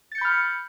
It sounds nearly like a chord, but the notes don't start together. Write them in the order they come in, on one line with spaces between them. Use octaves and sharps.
A6 C#7 G6 B5 F6